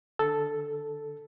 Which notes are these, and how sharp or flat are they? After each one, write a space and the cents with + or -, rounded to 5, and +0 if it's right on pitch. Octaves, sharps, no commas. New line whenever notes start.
D3 +5 A4 +0